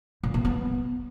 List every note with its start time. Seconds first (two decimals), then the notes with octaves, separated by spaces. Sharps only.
0.23 A#2
0.34 A#3
0.45 B3